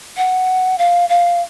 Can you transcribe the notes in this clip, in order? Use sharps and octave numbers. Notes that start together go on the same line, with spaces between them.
F#5
F5
F5